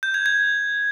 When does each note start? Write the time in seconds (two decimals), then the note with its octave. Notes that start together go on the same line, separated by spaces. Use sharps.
0.03 G6
0.14 G#6
0.26 G#6